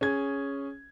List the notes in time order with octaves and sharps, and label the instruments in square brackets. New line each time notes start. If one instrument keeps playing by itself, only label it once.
[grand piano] C#4 G#4 G#6